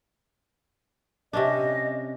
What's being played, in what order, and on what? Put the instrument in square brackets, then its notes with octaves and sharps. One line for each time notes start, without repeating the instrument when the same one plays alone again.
[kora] C3 C#4 D4 [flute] D#5